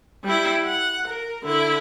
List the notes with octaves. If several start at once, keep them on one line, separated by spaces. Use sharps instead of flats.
G3 E4
F#5
A#4
D3 E4